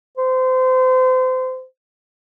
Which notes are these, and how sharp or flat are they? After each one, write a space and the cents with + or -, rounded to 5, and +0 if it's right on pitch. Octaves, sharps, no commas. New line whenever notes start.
C5 -30